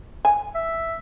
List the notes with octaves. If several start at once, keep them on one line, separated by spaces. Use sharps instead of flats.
G#5
E5